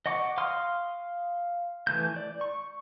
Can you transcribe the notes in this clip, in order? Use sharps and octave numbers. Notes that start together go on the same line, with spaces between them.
D#5 F#5 C#6 D6
F5 C6 D#6 F6
E3 A3 G6
D5
C#6